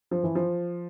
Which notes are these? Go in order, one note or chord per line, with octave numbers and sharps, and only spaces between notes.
F3
E3
F3